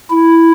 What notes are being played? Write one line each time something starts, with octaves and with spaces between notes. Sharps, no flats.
E4